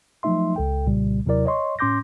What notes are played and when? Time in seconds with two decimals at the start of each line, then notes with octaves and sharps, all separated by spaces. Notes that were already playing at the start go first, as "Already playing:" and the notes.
0.23 F3 F#3 A3 D#4 E5 C6
0.56 C#2 A4 G5
0.87 C2 A#2 C#3 G3
1.26 D#2 C3 F#3 E4 A#4 D5
1.46 C#5 D#5 C6 C#6
1.79 A2 C#4 C6 D6 G6 A#6